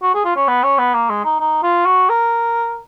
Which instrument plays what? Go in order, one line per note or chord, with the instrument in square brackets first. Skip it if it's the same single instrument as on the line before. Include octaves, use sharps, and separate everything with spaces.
[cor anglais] F#4
G#4
F4
C#4
B3
C#4
B3
A#3
G#3
D#4
D#4
F4
F#4
A#4